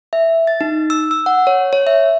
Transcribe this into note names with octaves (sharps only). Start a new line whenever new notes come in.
E5
A6
D#4
E6
E6
F#5
C#5
C#5
E5